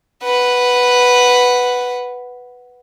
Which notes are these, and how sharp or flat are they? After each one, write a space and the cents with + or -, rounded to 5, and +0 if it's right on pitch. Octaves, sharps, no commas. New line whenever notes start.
B4 +0 F#5 +0